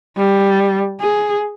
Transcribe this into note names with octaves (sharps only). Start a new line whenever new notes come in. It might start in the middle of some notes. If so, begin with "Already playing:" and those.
G3
G#4